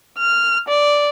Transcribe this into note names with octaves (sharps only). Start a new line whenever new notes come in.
F6
D5